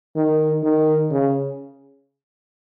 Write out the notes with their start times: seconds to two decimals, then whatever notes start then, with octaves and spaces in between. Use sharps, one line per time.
0.15 D#3
0.63 D#3
1.11 C#3